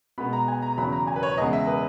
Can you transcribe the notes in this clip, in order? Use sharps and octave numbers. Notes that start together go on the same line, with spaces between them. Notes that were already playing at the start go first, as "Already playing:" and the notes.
B2 G#3 B3 B5
A#5
G#5
A#5
A#5
E2 C#3 F#3 B5
A#5
G#5
B4
C#5
E2 C#3 G#3 B3 D#5
E5
B4